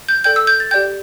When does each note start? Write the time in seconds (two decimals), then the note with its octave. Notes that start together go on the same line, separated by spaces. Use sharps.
0.09 G6
0.24 A4 D5 G5 G6
0.36 E6
0.47 G6
0.60 A6
0.71 G4 D5 G5 G6